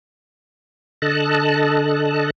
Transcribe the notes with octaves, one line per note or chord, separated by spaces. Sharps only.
D3 A4 D#5 A5 F#6